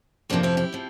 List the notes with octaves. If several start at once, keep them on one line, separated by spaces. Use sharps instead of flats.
F2 C3 F3 A#3 D4
C4 E4
E4 G4
C3 F3